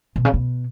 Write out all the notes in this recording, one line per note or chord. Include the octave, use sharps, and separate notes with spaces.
B2
C#3
B2